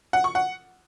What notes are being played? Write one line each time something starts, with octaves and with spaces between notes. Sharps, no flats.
F#5
C#6
F#5